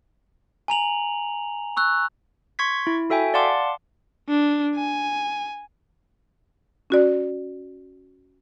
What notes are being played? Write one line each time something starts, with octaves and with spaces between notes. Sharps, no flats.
G#5 A#5 F7 F#7
C#6 E6 F#6
C6 C#6 G#6 B6
E4
F#4 A4 E5 G5 G#5
D5 F5 F#5 A5 C6 D6
D4
G#5
C#4 F#4 D5